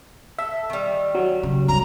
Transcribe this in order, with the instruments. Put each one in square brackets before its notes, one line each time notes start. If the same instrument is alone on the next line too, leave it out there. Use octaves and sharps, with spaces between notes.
[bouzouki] A4 [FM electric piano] E5
[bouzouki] D#3 G3
[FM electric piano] F#3
[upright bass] C#3
[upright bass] C2 E3 [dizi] A#5